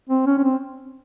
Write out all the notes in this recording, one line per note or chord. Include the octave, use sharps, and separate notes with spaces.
C4
C#4
C#4
C4